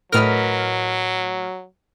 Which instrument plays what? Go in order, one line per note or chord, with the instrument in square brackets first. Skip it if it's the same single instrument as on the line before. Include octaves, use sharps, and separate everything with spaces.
[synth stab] A2 F6 [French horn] F#3 [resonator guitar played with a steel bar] A#4 B4 D#5